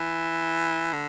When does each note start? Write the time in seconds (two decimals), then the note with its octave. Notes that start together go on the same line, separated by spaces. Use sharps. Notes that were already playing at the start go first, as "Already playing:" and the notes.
Already playing: E3
0.93 D3